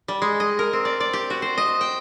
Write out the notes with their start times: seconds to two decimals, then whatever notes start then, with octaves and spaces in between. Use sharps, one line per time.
0.08 G3
0.22 G#3
0.40 D#5
0.59 A#4
0.73 C4
0.85 D5
1.00 D5
1.13 G4
1.30 F#4
1.42 C5
1.58 D#5
1.81 G5